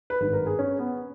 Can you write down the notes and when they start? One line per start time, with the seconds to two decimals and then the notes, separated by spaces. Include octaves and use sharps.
0.10 B4
0.21 G#1 G2 D#3 B4
0.33 A#4
0.46 G#4
0.59 C#4
0.79 B3